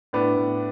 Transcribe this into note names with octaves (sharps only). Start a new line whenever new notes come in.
A2 B3 D4
A2